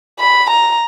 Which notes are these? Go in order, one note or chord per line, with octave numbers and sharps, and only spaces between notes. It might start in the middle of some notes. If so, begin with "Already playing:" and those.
B5
A#5